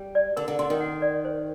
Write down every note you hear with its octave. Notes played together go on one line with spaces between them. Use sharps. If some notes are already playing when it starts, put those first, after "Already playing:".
Already playing: G3
D5
D3 A#4
D3
D3 C6
D#3
F#5
D5
C5